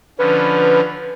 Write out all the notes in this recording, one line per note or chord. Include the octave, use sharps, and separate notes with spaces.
D3 F3 C#4 B4